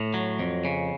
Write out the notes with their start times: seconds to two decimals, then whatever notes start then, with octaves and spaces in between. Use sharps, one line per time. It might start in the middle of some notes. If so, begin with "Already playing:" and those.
Already playing: A2
0.14 F#3
0.39 F2
0.65 C#3